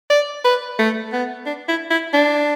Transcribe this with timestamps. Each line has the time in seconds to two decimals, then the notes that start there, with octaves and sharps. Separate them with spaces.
0.10 D5
0.44 B4
0.79 A3
1.12 B3
1.46 D4
1.68 E4
1.91 E4
2.13 D4